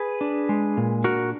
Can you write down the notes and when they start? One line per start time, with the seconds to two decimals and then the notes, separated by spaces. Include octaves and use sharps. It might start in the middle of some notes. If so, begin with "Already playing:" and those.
Already playing: G#4 B4
0.21 D4
0.49 G#3
0.77 A#2
1.04 D4 F#4 A#4